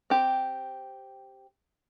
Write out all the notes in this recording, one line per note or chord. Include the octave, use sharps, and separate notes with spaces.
C4 G4